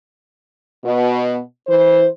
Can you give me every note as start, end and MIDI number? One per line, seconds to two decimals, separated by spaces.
0.85 1.39 47
1.67 2.07 52
1.67 2.07 72